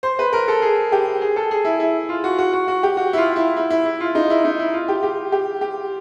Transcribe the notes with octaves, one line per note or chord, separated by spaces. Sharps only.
C5
B4
A#4
A4
G#4
G4
G#4
A4
G#4
E4
E4
F4
F#4
F#4
F#4
F#4
G4
F#4
E4
F4
E4
E4
E4
E4
F4
D#4
E4
D#4
E4
F4
G4
G4
G4
G4